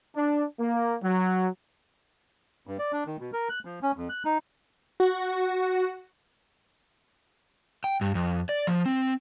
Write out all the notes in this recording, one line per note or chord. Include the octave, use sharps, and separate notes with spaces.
D4
A#3
F#3
G2
D5
D4
D#3
B2
A#4
F#6
F3
C#4
F2
F#6
D#4
F#4
G5
G2
F2
D5
F3
C4